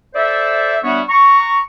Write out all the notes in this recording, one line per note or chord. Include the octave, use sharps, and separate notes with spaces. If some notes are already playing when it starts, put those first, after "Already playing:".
A4 C5 D5 E5
G3 B3 D4 F#4 C#5 E5
A#5 C#6